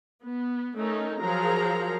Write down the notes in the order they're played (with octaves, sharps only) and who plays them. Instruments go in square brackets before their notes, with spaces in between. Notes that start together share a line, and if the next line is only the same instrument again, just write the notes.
[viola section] B3
A3 C#4 D#4 A#4
F3 F#3 G#4 A#4 F5 A#5